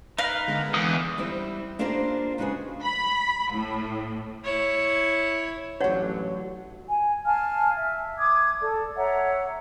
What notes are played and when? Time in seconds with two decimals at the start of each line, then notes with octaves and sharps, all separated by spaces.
0.18 D#4 A#4 B4 F5
0.48 D3 G#3 B3
0.74 E2 E3 D#6
1.18 G3 C4 E4
1.79 A#3 D4 F4 G4 A#4 C5
2.38 C#3 G#3 B3 F#4 G#4
2.84 B5
3.52 A2
4.45 E4 C#5
5.81 A1 D3 F#3 C#5 D5 F#5
6.88 G#5
7.25 F5 G#5 A5 F6
7.77 E5
8.18 D6 D#6 G#6
8.60 A4 D5
8.95 C#5 E5 F#5 A#5